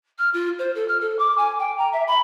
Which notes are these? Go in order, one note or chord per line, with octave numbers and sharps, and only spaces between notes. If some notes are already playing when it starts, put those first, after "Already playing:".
F6
F4
C5
A4
F6
A4
D6
G#5
G5
A#5
E5
B5